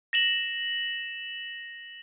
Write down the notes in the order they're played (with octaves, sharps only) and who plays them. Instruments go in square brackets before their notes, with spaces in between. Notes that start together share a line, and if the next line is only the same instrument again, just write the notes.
[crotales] A#6 E7 F#7